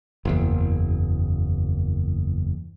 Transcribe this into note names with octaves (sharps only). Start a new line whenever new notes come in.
F#1 E2